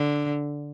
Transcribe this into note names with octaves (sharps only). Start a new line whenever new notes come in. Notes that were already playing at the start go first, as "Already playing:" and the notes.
Already playing: D3